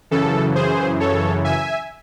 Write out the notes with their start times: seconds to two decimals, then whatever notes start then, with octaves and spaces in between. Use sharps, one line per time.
0.11 F#2 C#3 E3 A4
0.55 G#4 C5
1.00 A4 C#5
1.44 E5 G#5